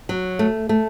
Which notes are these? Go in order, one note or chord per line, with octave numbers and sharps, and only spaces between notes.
F#3
A3
A3